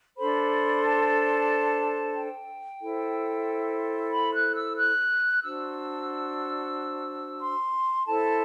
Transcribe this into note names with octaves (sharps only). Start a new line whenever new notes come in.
D4 A4 C5 B5
A5
G5
E4 A4 C5
B5
F#6
E6
F#6
D4 F#4 C5 E6
C6
E4 A4 C5 A5